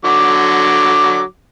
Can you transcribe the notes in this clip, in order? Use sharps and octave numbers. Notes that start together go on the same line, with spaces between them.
D3 F#3 D6